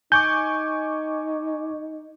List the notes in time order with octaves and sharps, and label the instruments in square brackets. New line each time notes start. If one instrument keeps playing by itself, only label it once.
[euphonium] D#4 [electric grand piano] G#5 C#6 D6 [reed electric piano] G6